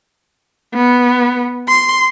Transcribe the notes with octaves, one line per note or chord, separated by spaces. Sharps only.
B3
C6